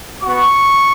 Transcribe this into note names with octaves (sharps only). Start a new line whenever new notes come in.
B3 F#4 C#6